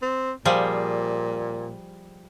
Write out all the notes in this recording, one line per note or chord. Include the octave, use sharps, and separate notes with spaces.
C4
A#2 F3 G3 G#4